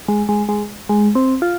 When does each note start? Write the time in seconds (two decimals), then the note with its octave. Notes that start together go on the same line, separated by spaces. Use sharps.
0.08 G#3
0.29 G#3
0.49 G#3
0.89 G#3
1.15 C4
1.42 F4